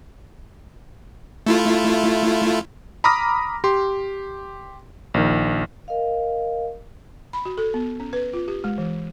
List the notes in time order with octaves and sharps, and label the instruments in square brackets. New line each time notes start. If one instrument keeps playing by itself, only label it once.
[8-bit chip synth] A3 E4 F4
[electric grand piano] A#5 B5 D6 D#6 F6 A#6
G4 C6
A#1 D#3
[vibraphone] A#4 D#5 F5
[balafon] B5
F#4
A4
B3
C#4
B4
F4
G4
G#3
E3